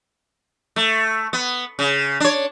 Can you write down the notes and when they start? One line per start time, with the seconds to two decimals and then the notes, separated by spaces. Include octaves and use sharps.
0.76 A3
1.33 B3
1.79 C#3
2.20 D4 C#5